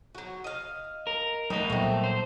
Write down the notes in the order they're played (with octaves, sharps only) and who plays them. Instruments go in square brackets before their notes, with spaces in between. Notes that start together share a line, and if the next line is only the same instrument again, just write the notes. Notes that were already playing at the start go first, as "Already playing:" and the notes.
[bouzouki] F#3 F#4
D#5 F5
[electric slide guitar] A#4
[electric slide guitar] G3 A#4 [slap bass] A3 [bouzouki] D#4 B4
[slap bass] A#2 F#3 B3 [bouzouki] A3 C4
[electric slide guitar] C5